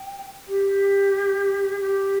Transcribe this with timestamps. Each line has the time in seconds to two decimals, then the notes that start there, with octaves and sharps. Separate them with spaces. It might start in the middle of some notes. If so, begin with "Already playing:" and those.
Already playing: G5
0.47 G4
1.80 G4